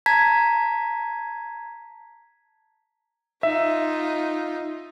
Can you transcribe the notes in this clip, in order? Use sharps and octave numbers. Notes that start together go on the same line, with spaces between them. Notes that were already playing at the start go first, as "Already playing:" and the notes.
A5 A#5 G#6 B6
D#4 F4 E5